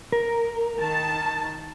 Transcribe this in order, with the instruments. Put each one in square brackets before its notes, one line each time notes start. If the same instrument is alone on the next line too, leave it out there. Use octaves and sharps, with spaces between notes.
[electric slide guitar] A#4
[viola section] D#3 A5